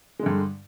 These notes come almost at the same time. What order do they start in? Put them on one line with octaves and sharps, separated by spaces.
G#3 D3 G2